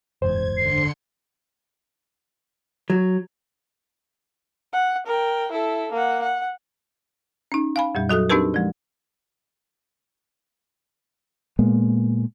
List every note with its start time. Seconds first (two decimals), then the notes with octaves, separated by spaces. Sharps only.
0.22 F#1 E2 G#2 C5 G#6
0.57 D3 C6 C7 C#7
2.90 F#3
4.73 F#5
5.06 A#4 G5
5.52 E4 A4
5.92 A#3 F#5
6.22 F#5
7.52 C#4 D#4
7.76 F5 G#5 B5
7.95 F2 A#2 G3
8.09 F#3 F#4 A4 F#6
8.30 C4 D4 D#4 G4 A#4 B4
8.54 F3 G#3
11.59 A#2 G#3 A#3 B3